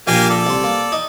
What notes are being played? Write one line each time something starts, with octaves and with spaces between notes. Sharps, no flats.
A#1 A#3 G4 G#5
A4 D5
C2 C6
A#3
D#4